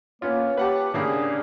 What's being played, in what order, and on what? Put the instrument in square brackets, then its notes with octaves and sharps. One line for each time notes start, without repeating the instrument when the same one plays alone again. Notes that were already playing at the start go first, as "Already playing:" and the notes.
[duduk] A#3 [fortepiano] B3 C#4 F4 [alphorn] C#5
[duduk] G4 [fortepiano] B4 F#5 A5
[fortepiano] A2 C#3 A#3 [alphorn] D4 [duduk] G#4